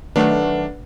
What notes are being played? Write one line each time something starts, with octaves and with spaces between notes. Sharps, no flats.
D#3 F#3 A3 D4 B4 F#5